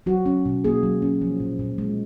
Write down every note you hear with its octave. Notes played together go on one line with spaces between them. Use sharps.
F#3 F#4
C#4
B2
A#3 G#4
F#3
C#4
F3
A#2
A#2
G#3